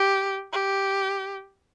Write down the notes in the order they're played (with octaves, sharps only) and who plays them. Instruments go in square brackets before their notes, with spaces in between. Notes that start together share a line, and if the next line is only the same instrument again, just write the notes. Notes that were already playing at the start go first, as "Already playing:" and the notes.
Already playing: [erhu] G4
G4